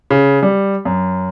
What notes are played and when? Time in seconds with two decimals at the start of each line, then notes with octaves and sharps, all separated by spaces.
0.11 C#3
0.43 G3
0.85 F#2